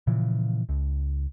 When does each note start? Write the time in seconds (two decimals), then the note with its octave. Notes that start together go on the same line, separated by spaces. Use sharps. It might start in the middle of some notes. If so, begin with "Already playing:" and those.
0.07 A#2 C#3 E3 F3
0.69 C#2